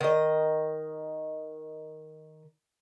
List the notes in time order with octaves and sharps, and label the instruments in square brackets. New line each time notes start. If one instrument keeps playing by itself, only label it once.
[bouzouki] D#3 D#5